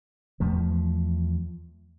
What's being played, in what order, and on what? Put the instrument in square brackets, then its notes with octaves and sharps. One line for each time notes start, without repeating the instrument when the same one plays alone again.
[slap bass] E2 F3 A3